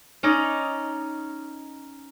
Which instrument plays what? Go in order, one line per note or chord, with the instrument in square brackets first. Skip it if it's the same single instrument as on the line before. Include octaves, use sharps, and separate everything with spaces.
[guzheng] C#4 D#4 D5 D#5